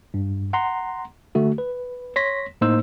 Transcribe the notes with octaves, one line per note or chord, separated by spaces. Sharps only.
G2
F#5 A#5 C6
D3 A3 F#4
B4
C#5 C6 A#6 B6
A2 A#3 D#4 C5 E6